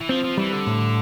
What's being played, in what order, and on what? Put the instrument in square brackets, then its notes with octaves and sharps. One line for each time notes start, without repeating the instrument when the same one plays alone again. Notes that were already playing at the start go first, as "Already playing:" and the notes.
[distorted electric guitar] E3
[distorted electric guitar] F3 [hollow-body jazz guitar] C4
[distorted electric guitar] F3
[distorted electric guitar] E3 [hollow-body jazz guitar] G3
[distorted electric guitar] D3
[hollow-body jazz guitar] A2